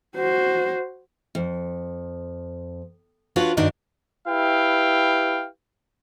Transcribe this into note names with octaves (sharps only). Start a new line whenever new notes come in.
F#4 C5
F2
D4 F4 F#4 B4 C#5
G2 D#3 D4 D#4 F#4
E4 G4 B4 F5 G5